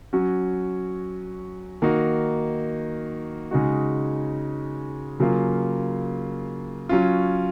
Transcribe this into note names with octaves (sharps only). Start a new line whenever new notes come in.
F#3 C#4 F#4
D#3 A#3 D#4 F#4
C#3 G#3 D#4 F#4
C#3 F#3 A#3 F4
F#3 C#4 F4